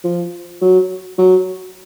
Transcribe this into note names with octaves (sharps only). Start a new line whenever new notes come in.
F3
F#3
F#3